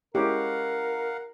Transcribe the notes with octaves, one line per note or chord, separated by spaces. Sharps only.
G#3 C#4 E4 G4 A#4 F5 F#5